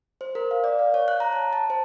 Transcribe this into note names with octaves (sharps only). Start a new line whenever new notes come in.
C5
A#4
F5
D5
F5
C#5
F#6
A#5
A5
A5
C5